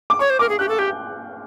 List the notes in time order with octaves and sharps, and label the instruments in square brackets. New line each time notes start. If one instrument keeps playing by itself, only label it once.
[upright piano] D6
[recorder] C#5 [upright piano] C#6
[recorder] C5
[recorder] A#4 [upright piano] D6
[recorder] G#4
[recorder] G4 [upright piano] F#6
[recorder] A4
[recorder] G4 [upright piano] G6